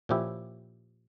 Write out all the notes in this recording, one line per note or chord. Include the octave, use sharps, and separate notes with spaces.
A#2 F3 C#4 E4 G4